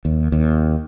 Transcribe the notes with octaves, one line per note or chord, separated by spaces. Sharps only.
D#2
D#2